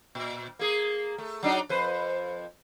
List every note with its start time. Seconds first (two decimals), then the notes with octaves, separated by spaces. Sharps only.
0.15 A#2
0.59 A#3 G#4
1.18 A3
1.43 F#3 D4 D#4
1.69 F2 B4 C5